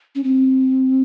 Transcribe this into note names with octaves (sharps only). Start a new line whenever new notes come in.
C#4
C4